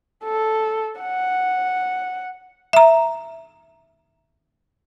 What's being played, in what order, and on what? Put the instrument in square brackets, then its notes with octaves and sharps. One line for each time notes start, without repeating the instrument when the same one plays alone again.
[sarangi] A4
F#5
[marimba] E5 A#5